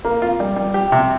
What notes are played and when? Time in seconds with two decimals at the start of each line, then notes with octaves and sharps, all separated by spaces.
0.05 A#3
0.22 F4
0.40 G3
0.56 G3
0.74 G4
0.92 C3